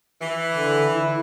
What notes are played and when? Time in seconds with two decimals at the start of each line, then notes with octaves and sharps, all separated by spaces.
0.21 E3
0.52 D3
0.94 E4